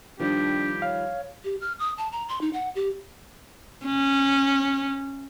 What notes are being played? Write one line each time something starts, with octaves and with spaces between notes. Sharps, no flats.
D#3 F3 G3 D4 G4
C#5 F5
G4
F6
D#6
A5
A#5
C6
D#4
F#5
G4
C#4